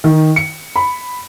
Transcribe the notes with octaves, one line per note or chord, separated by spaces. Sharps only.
D#3
C#7
B5